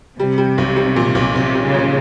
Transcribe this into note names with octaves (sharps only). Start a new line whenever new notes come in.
C3 G3
G3
B1
G3
A#2
B1
B1 C3
G3
C#3
A#2